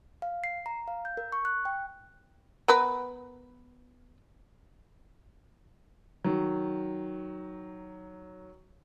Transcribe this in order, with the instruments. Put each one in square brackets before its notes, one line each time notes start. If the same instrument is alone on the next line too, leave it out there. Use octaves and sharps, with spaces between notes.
[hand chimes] F5
C7
A#5
F5
G6
A#4
C#6
F#6
G5
[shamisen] B3 A#4 B4
[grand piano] D#3 F#3